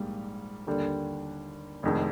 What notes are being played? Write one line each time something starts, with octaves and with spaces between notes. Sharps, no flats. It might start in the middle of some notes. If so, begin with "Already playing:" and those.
Already playing: A#1 G#2 G3 A#3
D#2 D3 G3 D4
F1 F2 D#3 G#3